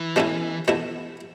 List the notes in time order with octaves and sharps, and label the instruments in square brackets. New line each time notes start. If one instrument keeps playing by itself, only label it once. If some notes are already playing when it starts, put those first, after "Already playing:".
Already playing: [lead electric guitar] E3
[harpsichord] B2 A3 C#4 E4
B2 A3 E4